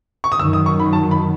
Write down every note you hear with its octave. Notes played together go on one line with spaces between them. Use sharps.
C#6
D#6
F#2 D#3 F#3 E6
D#6
C#6
B5
A5
B5